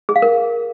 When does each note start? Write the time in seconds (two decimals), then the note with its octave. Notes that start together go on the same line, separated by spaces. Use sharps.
0.09 G#4
0.16 F5
0.22 A#4